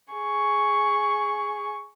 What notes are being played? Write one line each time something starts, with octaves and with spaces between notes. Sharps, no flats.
G#4 C#6